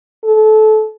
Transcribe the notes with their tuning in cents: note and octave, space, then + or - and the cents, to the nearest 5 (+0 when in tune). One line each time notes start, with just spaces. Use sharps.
A4 -25